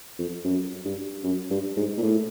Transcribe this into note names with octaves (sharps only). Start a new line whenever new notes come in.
F2
F#2
G2
F#2
G2
G#2
A#2
A2